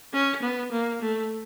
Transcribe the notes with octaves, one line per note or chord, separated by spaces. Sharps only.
C#4
B3
A#3
A3